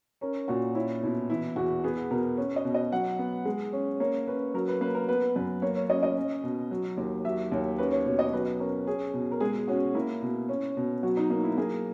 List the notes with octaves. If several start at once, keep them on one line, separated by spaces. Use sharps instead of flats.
C#4 A#4
A#2 F#4
C#4 E4
B2 E4
E3 E4
E2 F#4
B3 G#4
B2 A#4
C#4
D#5
B2
D#5
F#3 F#5
B3
G#3
C#4
A#3 C#5
C#4 B4
F#3 A#4
B4
A#3 B4
A#4
B3 B4
F#2 B4
A#3 C#5
C#5
C#4 D#5
D#5
C#4
B2
F#3
D#2
F#3 E5
D#2 C#5
C#4 B4
C#5
B2 C#5
D#5
F#3 B4
C#4 A#4
C#4 G#4
B2
A#4
G#3 G#4
C#4 F#4
A#3 E4
B2
C#4
B2
F#3 F#4
D#4
A#3 D#4
E4
A#3 G#4